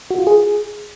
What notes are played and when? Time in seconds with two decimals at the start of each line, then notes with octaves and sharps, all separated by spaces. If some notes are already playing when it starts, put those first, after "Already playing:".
0.11 F#4
0.19 F4
0.27 G#4